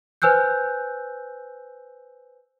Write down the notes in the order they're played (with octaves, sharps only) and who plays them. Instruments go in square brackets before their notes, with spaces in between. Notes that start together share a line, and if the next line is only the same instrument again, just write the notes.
[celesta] B4 C5 G#5 E6 F#6 G6